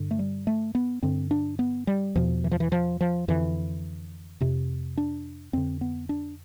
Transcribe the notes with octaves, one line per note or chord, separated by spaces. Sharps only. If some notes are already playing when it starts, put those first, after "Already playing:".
Already playing: G2 D3
A3
G3
A3
B3
G2 D3 C4
D4
B3
G3
E2 B2 F3
E3
F3
E3
F3
F3
F2 D3 E3
F2 C3
D4
F2 D3 C4
B3
D4